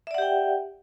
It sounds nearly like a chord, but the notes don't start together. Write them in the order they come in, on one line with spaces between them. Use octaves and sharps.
E5 D5 F#5 G4 G5